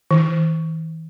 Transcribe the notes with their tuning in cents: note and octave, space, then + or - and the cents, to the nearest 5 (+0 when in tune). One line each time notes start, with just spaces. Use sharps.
E3 -40